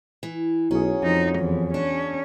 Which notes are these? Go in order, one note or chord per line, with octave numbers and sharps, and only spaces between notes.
E3
B1 F#3 C#4 G#4
F2 F3 D#4 D#6
E2 F3
C#4 D4